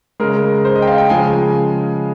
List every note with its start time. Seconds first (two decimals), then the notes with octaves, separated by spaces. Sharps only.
0.20 C#3 G#3 A#4
0.65 C5
0.75 D#5
0.82 G5
0.87 F5
0.98 G5
1.10 C#3 F3 G#3 G#5